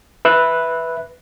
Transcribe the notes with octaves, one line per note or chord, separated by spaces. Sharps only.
B4 E5 F#6